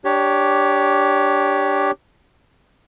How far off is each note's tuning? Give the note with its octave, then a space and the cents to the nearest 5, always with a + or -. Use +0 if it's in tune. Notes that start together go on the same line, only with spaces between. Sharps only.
D4 +0 G4 +0 C#5 +15